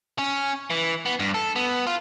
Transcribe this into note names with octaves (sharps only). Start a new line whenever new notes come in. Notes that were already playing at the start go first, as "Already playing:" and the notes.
C#4
E3
B3
G2
A4
B3
F4